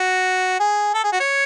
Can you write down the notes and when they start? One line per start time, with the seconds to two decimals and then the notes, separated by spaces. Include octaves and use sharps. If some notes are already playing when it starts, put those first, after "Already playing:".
Already playing: F#4
0.60 G#4
0.94 A4
1.04 G#4
1.13 F#4
1.20 C#5